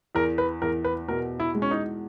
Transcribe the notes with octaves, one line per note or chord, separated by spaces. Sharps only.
E2 A#4
B4
E2 A#4
B4
B2 A#4
E4
G#3
C#4
D#4